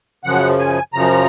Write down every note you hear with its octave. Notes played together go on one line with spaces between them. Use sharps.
F#2 C#3 F3 F#5
G#5
F#2 C#3 F3 A#5